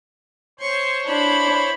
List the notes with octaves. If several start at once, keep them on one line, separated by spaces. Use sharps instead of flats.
C5 C#5 C6 C#6
D4 E4 B5